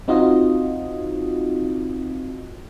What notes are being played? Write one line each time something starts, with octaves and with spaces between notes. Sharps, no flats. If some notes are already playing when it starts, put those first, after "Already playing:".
C4 D#4 F4 F#4 D#5